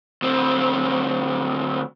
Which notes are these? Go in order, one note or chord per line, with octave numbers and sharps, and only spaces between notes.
D2 C4